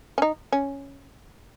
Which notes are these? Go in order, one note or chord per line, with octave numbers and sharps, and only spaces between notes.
C#4
D#4
C#4